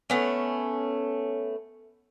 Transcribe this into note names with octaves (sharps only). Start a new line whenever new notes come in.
A3 B3 C#4